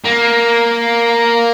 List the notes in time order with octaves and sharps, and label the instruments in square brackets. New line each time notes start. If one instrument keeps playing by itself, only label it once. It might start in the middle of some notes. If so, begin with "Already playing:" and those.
[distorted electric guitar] A#3